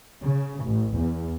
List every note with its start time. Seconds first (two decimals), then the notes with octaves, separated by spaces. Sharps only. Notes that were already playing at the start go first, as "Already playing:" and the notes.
0.23 C#3
0.64 A1
0.96 E2